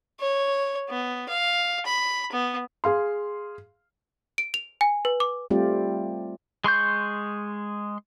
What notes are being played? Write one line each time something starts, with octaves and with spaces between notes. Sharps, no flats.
C#5
B3
F5
B5
B3
G#4 F5 C6
D7
F7
G#5
B4
D6
G3 A3 C4 F4 G4 D5
G#3 C6 C#6 G6